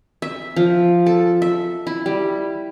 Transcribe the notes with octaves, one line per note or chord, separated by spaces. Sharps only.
E5
F3
A4
E5
E4
G3